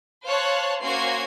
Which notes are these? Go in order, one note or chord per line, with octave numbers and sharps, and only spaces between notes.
C5 C#5 F5 A5 C#6 F#6
A#3 C#4 F#4 C5 G#6 C7